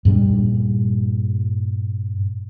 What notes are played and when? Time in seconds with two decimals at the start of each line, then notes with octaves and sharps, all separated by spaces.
0.05 G2 A#2 G3 D4